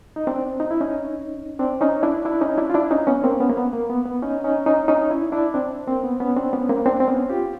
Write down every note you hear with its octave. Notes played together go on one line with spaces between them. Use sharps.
D#4
C4 D4
D#4
E4
C#4 D#4
C4 D4
C#4 D#4
D4 E4
D4 E4
C#4 D#4
D4 E4
F4
D4 E4
C#4 D#4
B3 C#4
A#3 C4
B3 C#4
A#3
B3
A#3
B3
B3
C#4 D#4
C#4 D#4
C#4 D#4
C#4 D#4
D4 E4
D4 E4
C4 D4
A#3 C4
B3
B3 C#4
C4 D4
B3 C#4
A#3 C4
C4 D4
C4
B3 C#4
F4 G4